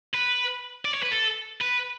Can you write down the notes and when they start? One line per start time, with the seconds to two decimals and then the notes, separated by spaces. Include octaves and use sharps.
0.14 B4
0.85 D5
0.94 C#5
1.03 B4
1.12 A4
1.61 B4